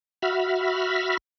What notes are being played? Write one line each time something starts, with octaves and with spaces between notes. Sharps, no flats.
F#4 E5 B5 F6